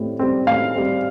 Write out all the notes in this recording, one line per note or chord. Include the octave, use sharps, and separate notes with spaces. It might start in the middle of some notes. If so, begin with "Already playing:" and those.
Already playing: A2 G3 C4
G3 C4
A2 F5
G3 C4